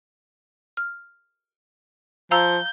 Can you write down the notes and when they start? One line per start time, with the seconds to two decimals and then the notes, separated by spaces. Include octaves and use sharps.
0.77 F6
2.31 F3 F5 A#5 E6 G6